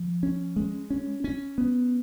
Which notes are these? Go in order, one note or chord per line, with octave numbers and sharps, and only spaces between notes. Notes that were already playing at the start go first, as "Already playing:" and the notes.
Already playing: F3
C#4
G#3
C#4
C#4
B3